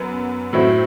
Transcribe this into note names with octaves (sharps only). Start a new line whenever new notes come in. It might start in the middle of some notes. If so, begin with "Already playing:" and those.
Already playing: F#2 B3
A2 F#3 C4 E4